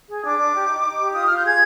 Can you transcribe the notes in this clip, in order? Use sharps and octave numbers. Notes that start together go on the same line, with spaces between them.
G#4
D4 D6
D4
G4
D#4
D#4
G4
F4 D#6
F4 F6
G6
G#4 G#6